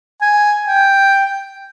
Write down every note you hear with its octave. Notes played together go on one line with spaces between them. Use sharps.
G#5
G5